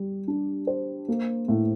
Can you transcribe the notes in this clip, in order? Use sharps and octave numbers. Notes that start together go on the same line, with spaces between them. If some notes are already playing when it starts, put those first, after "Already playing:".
Already playing: G3 G4
D4
C5
A#3
A2